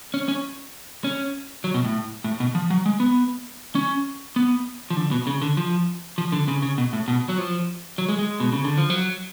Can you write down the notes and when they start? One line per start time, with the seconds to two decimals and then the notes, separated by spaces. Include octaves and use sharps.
0.14 C#4
0.28 C#4
1.04 C#4
1.64 F#3
1.74 B2
1.85 A2
2.24 A2
2.40 B2
2.55 F3
2.70 F#3
2.86 G#3
3.00 B3
3.75 C#4
4.36 B3
4.90 F3
4.96 D3
5.11 B2
5.27 C#3
5.42 D3
5.57 F3
6.18 F3
6.32 D3
6.48 C#3
6.62 C#3
6.78 B2
6.93 A2
7.08 B2
7.29 F#3
7.38 F3
7.98 F#3
8.09 G#3
8.19 G#3
8.40 B2
8.52 C#3
8.64 D3
8.77 F3
8.90 F#3